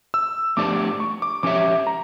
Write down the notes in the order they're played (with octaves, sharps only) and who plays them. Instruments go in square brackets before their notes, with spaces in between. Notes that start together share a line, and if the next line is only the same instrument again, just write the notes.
[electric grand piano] E6
[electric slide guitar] F3 A3 D4 G4 D5 [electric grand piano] D6
[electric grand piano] C#6
D6
[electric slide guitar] F3 C#4 G4 C#5 E5 [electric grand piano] D6
[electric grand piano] A#5